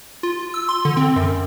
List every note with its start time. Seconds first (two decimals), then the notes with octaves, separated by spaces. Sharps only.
0.23 F4
0.54 E6
0.69 C6
0.85 D3
0.97 C4
1.16 F#2